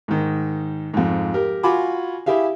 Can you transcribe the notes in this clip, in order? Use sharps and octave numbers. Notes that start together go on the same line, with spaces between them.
G#2 D#3
F2 G#2
G4 A#4
F4 F#4 G#5 B5 D6
E4 G4 G#4 E5 F5